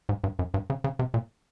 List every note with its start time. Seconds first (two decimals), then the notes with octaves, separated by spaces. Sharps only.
0.09 G#2
0.24 G2
0.39 F#2
0.54 G2
0.70 C#3
0.84 C#3
0.99 C3
1.14 A#2